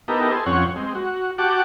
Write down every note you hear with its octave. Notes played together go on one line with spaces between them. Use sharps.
B3 D#4 E4 G4 A4 A#4
G#4 A4 C5
F2 C4 C#4 C#5 F#5
G#3 C4
F#4
F#4 G4 F#5 A5 D6